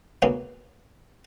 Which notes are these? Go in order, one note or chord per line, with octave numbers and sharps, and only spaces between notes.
D2 C#3 A#3 B3 C#4